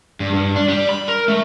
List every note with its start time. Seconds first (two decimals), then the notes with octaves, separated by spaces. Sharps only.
0.20 G2
0.34 G2
0.56 D4
0.68 G3
0.89 B5
1.08 A#4
1.28 A3